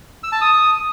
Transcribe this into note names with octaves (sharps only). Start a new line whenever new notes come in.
E6
A5
D#6